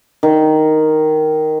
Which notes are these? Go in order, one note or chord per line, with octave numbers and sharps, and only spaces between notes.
D#3